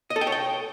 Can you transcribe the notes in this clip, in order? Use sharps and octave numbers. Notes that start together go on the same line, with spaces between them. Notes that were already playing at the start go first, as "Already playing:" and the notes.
D#5
A4
G5
C#5
G5